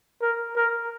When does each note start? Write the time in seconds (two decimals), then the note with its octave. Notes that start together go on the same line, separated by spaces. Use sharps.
0.22 A#4
0.56 A#4